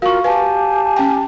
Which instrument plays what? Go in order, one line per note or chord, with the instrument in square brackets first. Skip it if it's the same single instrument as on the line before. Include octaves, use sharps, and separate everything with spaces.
[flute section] F4 A#4 [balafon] F#4 [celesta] F5 C#6
[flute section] G4 G#5 A5 [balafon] B4 [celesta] F5
[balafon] C#4 G5